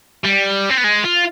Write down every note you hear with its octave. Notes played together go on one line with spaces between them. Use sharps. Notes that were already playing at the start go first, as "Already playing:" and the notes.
G3
C4
B3
G#3
F4